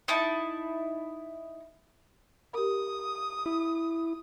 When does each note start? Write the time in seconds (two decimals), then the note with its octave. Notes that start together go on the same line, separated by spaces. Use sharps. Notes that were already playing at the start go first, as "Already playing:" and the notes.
0.08 D#4 E4 A5
2.54 G4 A#4 D#6
3.46 E4